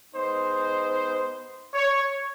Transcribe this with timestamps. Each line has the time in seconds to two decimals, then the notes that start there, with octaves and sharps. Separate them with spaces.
0.12 G#3 B3 D#4 C5
1.73 C#5